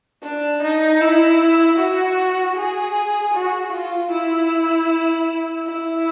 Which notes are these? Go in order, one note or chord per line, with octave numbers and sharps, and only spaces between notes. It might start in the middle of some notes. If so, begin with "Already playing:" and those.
D4
D#4
E4
F#4
G#4
F#4
F4
E4
E4